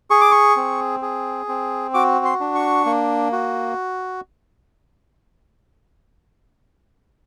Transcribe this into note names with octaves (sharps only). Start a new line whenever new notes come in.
G#4 C#6
D6
C#6
C4
G#4
C4
F#4 D6
C6
D4
C#6
A#3
F#4